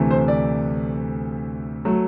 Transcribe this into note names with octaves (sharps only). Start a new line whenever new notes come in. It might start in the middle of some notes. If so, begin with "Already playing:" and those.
Already playing: D2 C3 E3 A3 C4
C5
D5
F#3 A3